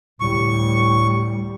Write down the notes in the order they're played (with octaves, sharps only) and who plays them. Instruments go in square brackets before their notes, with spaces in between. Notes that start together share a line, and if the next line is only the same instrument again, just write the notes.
[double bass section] D2 G3 [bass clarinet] A2 [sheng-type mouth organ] C#6